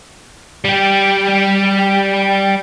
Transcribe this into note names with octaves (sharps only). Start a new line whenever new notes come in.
G3 G4